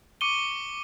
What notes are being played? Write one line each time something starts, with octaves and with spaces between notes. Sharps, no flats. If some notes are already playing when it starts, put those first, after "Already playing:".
C#6 D6 C#7 D#7 G7